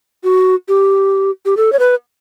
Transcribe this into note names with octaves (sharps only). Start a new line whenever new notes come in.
F#4
G4
G4
A4
C#5
B4